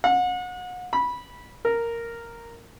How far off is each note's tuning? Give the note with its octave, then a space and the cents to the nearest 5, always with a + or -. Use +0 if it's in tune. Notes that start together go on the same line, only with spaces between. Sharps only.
F#5 -35
B5 -15
A#4 -5